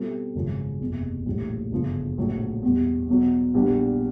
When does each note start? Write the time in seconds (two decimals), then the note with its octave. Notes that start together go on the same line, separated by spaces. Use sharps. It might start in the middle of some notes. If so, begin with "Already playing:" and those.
Already playing: B2 G3 C4 F4 A4
0.35 G#1 F#2 C#3 F3
0.81 F#1 E2 C3
1.26 A#1 A2 E3 G3
1.71 G1 F#2 C#3 F3
2.18 A#1 A2 F#3
2.63 E2 B2 G3
3.08 E2 B2 F#3
3.54 A#1 A#2 G3 B3 D4